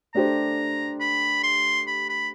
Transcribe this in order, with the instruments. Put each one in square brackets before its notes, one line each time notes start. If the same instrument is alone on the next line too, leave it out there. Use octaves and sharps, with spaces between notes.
[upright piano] A3 D4 G4 C5 [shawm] A#5
[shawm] B5
C6
B5
B5